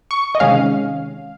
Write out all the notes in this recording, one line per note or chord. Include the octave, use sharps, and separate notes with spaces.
C#6
D#5
C3 D#3 G#3 C#4 F5